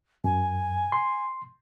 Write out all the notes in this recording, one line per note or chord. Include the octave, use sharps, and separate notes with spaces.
F#2 G#5
C6